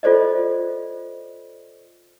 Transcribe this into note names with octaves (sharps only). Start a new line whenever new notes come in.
F4 A4 C5 D5 D#5